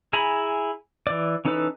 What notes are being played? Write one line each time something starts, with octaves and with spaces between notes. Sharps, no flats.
E4 G#4 G#5 A#5 B5
E3 D5
E3 C#4 D#4 A4 B4